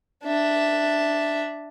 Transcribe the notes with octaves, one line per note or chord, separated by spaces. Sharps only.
D4 E5